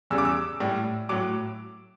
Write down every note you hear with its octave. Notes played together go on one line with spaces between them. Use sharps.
E2 C#3 G3 E6
D6
E6
A2 G3
A2 F#3 D6